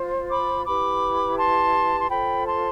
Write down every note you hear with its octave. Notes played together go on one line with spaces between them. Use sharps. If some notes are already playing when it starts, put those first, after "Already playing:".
Already playing: F4 C5
B5 D6
E4 G4 B4 B5 D6
A5 C6
C6
F4 A4 C5 G5 B5
A5 C6